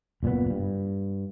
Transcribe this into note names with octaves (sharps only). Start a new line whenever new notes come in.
F#1 A#2 C#3 B3
G2